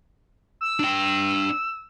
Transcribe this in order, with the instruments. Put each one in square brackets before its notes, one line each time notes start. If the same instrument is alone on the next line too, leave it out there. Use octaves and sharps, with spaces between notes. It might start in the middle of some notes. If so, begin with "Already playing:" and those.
[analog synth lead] E6
[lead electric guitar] D4 G5